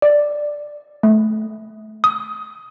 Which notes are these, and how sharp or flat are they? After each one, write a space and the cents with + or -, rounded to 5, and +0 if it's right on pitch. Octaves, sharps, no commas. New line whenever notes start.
D5 +5
A3 -20
D#6 +20